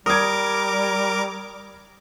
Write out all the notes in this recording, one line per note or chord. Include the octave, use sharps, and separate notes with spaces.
G3 A#4 D6 D#6 G#6